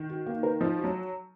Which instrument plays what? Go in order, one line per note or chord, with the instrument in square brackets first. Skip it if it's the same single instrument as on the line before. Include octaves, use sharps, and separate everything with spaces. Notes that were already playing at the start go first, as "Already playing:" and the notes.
Already playing: [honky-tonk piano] D#3
[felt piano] F#4
A#3
A#4
[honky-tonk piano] F3 [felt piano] D#4
[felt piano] F#4
[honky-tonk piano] F#3